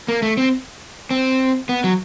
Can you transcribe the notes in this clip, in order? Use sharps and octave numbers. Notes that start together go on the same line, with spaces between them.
A#3
A3
C4
C4
B3
F#3